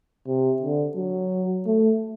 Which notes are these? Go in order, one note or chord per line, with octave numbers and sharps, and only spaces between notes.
C3
D3
F#3
A3